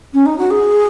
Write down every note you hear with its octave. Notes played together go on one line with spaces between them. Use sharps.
C#4
D#4
F#4
G#4